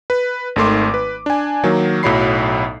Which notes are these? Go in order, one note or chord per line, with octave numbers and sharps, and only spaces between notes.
B4
G#1 D#3 A3 C6 D6
B4
D4 G#5
D#3 F#3 A#3
B1 A2 F#3 C#5 B5 C7